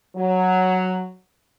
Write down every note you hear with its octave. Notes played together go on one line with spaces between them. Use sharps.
F#3